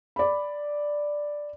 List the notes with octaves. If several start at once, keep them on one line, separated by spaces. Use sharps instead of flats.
D5 B5